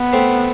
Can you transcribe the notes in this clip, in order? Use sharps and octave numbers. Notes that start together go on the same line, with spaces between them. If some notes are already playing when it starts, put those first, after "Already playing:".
Already playing: B3
A3 C4